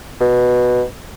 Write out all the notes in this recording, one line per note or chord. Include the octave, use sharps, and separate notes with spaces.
B2